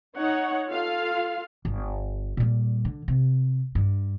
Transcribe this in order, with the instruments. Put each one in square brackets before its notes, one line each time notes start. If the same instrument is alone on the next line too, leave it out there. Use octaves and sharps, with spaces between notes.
[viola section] D#4 C#5 F#5
F4 A4 F5
[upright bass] G1
A#2 G3
D3
C3
G2